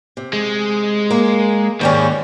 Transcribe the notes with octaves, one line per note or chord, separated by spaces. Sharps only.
C3
G#3
A#3
D#2 G#2 G3 C#4